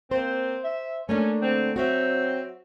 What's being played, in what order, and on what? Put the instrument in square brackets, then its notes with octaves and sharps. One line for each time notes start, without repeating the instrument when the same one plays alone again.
[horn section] A#3 C4 [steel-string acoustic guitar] C5
[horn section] E5
[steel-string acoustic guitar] A3 A#3 D4 [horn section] C#4
[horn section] D3 C4
[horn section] F#3 C4 [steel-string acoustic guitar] F#4 C#5 E5